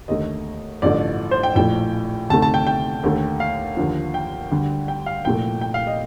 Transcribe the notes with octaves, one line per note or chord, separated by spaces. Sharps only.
D#2 D3 A3 D#5
A1 G2 D3 F3 A3 D5
C5
G5
A#1 A2 F3 A3 G5
D2 C3 D#3 A3 A5
A5
G5
G5
D#2 D3 A3
F5
D#2 D3 F3
G5
D2 D3 G3
G5
F5
C2 A#2 F3 A3 G5
G5
F5
D#5